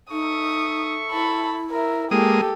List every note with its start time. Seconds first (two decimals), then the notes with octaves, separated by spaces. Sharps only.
0.11 D#4 A4 E5 C#6 D#6
1.12 E4 A5 B5
1.71 A#4 E5
2.11 G#3 A#3 G4 A4 D#6